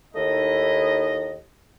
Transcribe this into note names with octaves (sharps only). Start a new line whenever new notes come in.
D#2 A3 D#4 E4 D#5